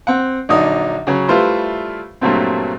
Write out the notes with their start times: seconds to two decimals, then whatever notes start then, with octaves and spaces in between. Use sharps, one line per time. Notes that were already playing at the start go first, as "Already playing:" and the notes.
0.07 C4 F#5
0.49 A#1 D3 F#3 D4 D#4 D#6
1.07 C#3 F#3
1.28 G3 A3 E4 F4 B4 C5
2.21 G2 A#2 F#3 A3 C4